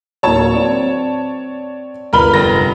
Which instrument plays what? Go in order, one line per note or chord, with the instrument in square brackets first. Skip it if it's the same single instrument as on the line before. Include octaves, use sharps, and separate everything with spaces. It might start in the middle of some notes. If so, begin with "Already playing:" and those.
[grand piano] D1 A#3 [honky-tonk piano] C#5 A5
[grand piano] C4 D5
[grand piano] G1 F6 G7 [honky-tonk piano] A#4 B4 B5
[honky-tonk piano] F1 A#6